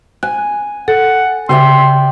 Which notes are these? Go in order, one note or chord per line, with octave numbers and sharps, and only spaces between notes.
G#5 F#6
A4 F#5
C#3 G4 D5 E5 C6